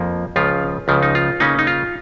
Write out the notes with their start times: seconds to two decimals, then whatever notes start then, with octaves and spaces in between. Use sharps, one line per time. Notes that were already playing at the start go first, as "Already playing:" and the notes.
Already playing: F2 F3 A#3
0.36 C#2 C#3 F3 F4
0.88 C#2 C#3 F3
1.03 D#4
1.15 F4
1.40 C#3 A#3 C#4 D#4
1.59 D#4
1.67 F4